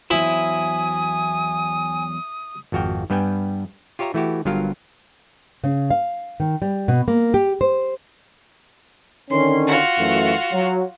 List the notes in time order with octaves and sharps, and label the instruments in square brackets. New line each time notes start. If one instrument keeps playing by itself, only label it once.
[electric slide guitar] E2 F#3 C5 [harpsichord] E4 [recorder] G#5 [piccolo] D#6
[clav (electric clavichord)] G#1 F2 F#4 F5 G5
G2 G3 B3 B4 G5 G#5
F4 G4 C#5 E5 A#5
E3 A3 E4 F#4 G4
G1 G2 F#3 F4 A#4 F5
[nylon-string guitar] C#3
F5
D#3
G3
B2
A#3
G4
C5
[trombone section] D3 D#3 C#4 [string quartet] C6
[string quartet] F4 F#4
[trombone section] F#2 E3 A3
F#3